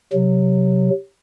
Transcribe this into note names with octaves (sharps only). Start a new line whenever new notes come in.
C3 F#3